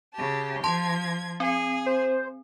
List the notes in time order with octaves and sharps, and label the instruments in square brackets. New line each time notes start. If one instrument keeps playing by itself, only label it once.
[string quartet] C#3 G4 A5
[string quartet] F3 G#6 [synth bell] A5 C6
[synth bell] C4 [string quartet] G#4
[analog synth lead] C5